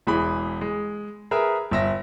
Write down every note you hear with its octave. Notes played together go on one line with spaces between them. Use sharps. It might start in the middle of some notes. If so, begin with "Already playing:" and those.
E1 E3 G#4 B5
G#3
G#4 A#4 B4 E5
G1 E5 A#6